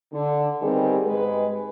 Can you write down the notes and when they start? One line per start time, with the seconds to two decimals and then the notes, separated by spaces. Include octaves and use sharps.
0.13 D3
0.62 D#3 G3 B3 C4 G4 G#4
1.06 G#2 G#3 B4